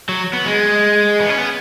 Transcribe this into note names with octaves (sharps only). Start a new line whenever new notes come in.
F#3
B3
G#3
B3
C#4
B3